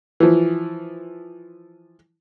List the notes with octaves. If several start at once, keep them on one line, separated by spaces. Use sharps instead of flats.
E3 F3